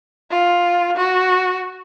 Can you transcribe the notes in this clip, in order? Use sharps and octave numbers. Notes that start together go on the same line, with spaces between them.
F4
F#4